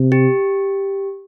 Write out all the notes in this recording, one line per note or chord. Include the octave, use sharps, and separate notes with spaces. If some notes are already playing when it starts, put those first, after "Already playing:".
Already playing: C3
G4